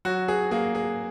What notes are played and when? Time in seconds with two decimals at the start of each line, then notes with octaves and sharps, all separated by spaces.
0.05 F#3 F#4
0.28 G#4
0.51 A#3 G#4
0.75 G#4